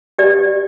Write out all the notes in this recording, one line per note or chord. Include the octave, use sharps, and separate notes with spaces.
G4 D5